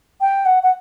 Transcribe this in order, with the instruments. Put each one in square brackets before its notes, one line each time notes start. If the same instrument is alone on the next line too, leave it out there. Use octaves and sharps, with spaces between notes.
[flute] G5
F#5
F#5